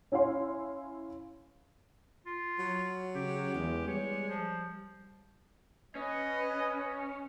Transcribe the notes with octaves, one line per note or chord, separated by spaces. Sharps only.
C#4 E4 C#5 F5 C6
F4
F#3
C#3 G4
E2 G#3
G3 C#5
F3
C#4 B4 D#5